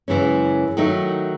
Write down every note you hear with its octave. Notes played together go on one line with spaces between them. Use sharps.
F#2 C#3 E3 G#3 C#4
D#3 F#3 A3 D#4